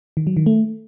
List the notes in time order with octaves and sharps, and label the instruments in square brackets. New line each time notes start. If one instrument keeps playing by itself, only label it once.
[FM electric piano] D#3
F#3
D#3
A3